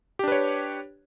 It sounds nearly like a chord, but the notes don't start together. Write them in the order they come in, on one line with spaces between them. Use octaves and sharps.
G4 D4 B4 C#5